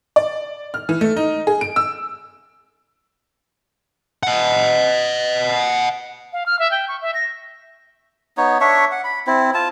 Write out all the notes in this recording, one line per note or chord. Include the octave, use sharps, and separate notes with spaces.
D5
F6
E3
A3
D#4
G#4
D7
E6
D#5 F#5
F5
F6
E5
G5
C#6
E5
A#6
B3 D#4 C#5
D4 C#5 E5 C#6
F#5
B5
C4 E4
F4 A5